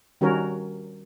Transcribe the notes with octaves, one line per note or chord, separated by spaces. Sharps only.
D#3 G3 C#4 F#4 A#4 C#5